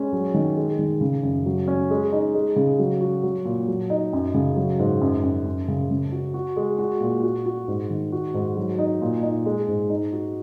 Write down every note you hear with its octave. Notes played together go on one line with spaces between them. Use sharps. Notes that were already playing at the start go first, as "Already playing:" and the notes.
Already playing: G#3 C#4
F#3
D#3
G#3
D#3
C#3
F#2
F#3
C#4
G#3
D#4
G#3
C#3
F#3
F#4
F#3
A#2
F#3
D#4
F#2
C#3
F#3
G#2
F#2
F#2
F#2
C#3
C#3
F#4
F#4
G#3
F#4
A#2
F#4
F#4
G#2
D#3
F#4
G#2
F#3
D#4
A#2
D#4
G#3
G#2
D#4
F#4